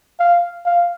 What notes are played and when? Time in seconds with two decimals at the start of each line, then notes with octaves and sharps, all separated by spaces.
0.20 F5
0.66 F5